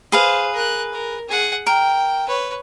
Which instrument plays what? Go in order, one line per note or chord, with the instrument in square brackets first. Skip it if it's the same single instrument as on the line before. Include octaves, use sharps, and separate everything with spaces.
[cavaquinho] G#4 B4 F5 [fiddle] C5
[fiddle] A#4 F#6
A#4
G#4 F#5
[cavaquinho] A#4 [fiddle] G5
[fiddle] B4 C#5